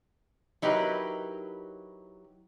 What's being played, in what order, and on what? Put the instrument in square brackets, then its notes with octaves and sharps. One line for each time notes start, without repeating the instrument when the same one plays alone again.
[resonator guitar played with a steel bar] F#3 D#4 E4 G4 A#4 B4